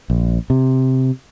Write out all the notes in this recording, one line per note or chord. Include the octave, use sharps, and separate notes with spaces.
A#1
C3